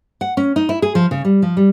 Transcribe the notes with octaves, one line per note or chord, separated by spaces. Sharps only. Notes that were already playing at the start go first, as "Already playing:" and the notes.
F#5
C#4
D#4
E4
G#4
F3
C#3
G3
F3
G3